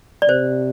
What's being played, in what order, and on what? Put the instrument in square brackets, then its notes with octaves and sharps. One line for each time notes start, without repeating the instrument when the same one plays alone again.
[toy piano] D5
[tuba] C3 [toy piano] C5